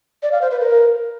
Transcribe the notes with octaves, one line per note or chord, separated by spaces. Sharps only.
D5
F5
C5
B4
A#4